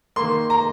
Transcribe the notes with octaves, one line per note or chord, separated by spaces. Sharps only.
D#3 A#3 C6
A#5